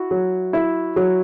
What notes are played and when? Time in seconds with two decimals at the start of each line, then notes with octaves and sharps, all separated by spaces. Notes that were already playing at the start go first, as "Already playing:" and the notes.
Already playing: E4 F#4
0.11 F#3
0.53 E4
0.96 F#3